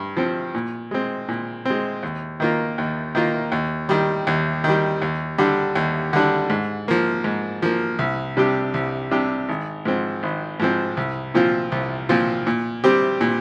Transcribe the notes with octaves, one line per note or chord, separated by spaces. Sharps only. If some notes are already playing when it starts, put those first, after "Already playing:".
Already playing: G2
F3 C4
A#2
G#3 C4
A#2
G#3 C4
D#2
D#3 A#3 F4
D#2
D#3 A#3 F4
D#2
D#3 G3
D#2
D#3 G3
D#2
D3 G3 D4
D#2
D3 G3 D4
G#2
F3 A#3
G#2
F3 A#3
C2
C3 G3 D4 G4
C2
C3 G3 D4 G4
G#1
G#2 F3 C4
G#1
G#2 F3 C4
C2
A#2 F3 C4 F4
C2
A#2 F3 C4 F4
A#2
G3 C4 G4
A#2